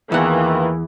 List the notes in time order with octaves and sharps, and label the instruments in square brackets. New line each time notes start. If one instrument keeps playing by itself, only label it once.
[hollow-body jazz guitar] E2 F#5 [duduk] D#3 [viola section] E3 [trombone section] A#3 F4 B4